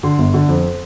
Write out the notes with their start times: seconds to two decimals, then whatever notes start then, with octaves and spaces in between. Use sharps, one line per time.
0.03 D3 C6
0.18 G1
0.34 D3
0.49 F2